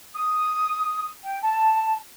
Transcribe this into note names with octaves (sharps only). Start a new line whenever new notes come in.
D#6
G5
A5